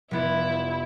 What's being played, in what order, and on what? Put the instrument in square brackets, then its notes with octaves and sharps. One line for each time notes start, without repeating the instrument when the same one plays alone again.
[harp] F1 B3 D5 [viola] E4